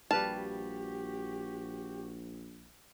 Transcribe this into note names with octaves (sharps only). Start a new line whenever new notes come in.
A#1 G3 F#4 G4 B4 F5 A5